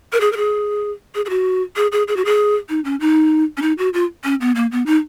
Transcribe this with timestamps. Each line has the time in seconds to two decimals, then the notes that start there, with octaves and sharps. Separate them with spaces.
0.13 A#4
0.21 G#4
0.32 A#4
0.37 G#4
1.15 G#4
1.25 G#4
1.30 F#4
1.76 G#4
1.92 G#4
2.08 G#4
2.17 F#4
2.25 G#4
2.69 D#4
2.85 C#4
3.01 D#4
3.57 C#4
3.62 D#4
3.78 F#4
3.94 F4
4.24 C#4
4.41 B3
4.56 A#3
4.72 B3
4.86 D#4